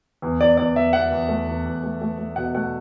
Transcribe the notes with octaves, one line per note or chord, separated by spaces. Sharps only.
E2
E2 D5
E2 D5
E2 E5
E2 F#5
E2
A3
E2
E2
A3
A3
A3
B2 F#5
A3 F#5